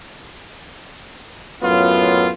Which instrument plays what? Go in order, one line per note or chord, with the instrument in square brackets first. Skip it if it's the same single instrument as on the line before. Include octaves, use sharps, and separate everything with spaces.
[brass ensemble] F#2 A2 B3 F4